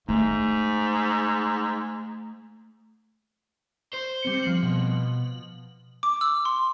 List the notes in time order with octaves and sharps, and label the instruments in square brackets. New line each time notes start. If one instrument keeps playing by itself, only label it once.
[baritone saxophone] G#2 [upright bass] A3
[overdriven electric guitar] C5
[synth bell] G3 C4 C#7
F3 F#7
[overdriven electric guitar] B2
[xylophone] D6
E6
C6